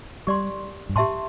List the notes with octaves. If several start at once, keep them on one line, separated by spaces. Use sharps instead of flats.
G3 G4 D5 C6
G2
A2 G4 E5 A5 C6